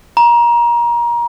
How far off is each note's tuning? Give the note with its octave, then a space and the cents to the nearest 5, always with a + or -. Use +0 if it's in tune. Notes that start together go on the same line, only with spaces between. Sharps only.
A#5 +25